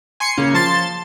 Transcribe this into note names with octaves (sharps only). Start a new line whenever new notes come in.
G#5 C6 C7 C#7
C#3 A#3 C#4
F3 A5 C6 A6